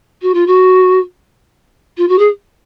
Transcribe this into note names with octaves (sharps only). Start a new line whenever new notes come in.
F#4
F4
F#4
F4
F#4
G#4